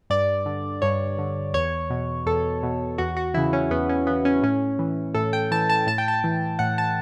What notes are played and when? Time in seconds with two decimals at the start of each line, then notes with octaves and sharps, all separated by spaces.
0.10 G2 D5
0.46 D3
0.82 G2 C#5
1.18 D3
1.54 E2 C#5
1.90 B2
2.26 E2 A4
2.63 B2
2.98 E2 F#4
3.17 F#4
3.34 C#3 E3 E4
3.53 C#4
3.70 E2 B3
3.89 C#4
4.06 C#3 E3 B3
4.25 C#4
4.42 A2 C#4
4.79 E3
5.14 A2 A4
5.33 G5
5.51 E3 A5
5.69 A5
5.87 A2 A5
5.98 G5
6.08 A5
6.24 E3
6.59 A2 F#5
6.78 A5